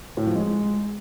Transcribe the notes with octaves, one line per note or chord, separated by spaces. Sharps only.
A2
F3
G#3